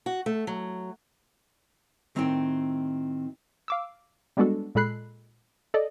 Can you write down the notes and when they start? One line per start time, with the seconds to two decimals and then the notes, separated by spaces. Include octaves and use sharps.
0.06 F#4
0.26 A3
0.47 F#3
2.15 A2 D#3 C4 F#4 C#5 G5
3.68 F5 D6 E6
4.37 G3 G#3 B3 D4 F#4 A4
4.75 A#2 G#3 A4 B5 F#6 C7
5.74 A4 D5 D#5